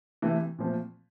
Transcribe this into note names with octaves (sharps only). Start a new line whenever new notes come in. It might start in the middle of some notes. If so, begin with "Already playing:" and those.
C3 E3 A3
A#2 F3 A3 C4